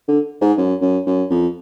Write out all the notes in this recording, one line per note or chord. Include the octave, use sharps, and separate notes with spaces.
D3
G#2
F#2
F#2
F#2
F2